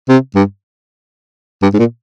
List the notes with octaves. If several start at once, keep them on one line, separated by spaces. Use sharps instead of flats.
C3
G2
G2
G#2
A#2